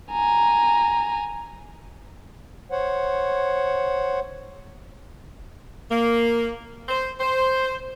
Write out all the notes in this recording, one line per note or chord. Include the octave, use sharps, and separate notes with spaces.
G#5 A#5
C5 C#5 F#5
A#3
C5
C5